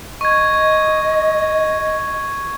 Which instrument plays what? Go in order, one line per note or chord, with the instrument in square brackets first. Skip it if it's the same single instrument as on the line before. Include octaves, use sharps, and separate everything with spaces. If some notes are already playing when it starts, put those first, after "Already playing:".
[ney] D#5 [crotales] C#6 G#6